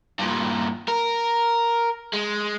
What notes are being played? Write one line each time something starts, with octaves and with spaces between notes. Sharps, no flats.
G2 A#2
A#4
G#3